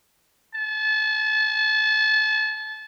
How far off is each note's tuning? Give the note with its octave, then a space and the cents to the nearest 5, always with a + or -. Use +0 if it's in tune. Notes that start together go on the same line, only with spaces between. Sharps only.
A5 -30